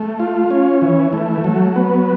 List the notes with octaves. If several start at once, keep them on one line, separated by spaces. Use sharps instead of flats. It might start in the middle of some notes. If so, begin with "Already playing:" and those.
Already playing: A3
F4
C#4
E3
A3
F#3
B3